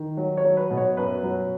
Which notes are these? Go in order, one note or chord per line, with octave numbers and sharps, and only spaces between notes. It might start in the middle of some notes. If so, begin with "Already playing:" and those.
Already playing: D#3
F#3
C#5
F#3
B4
B2
C#5
F#2 B4
F#3